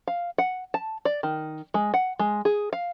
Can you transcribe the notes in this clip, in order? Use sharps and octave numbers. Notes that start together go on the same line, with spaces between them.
F5
F#5
A5
D5
D#3
G#3
F#5
G#3
G#4
F5